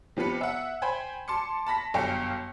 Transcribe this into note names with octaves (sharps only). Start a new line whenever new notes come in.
C3 F3 B3 B4 C#7
E5 F#5
C5 G5 G#5 B5 G#6
A5 C6 D6 C#7
A5 B5 A#6 B6
G1 F#2 F5 G5 C#7